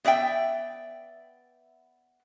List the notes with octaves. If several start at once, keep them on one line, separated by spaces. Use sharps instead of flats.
B3 D5 E5 G5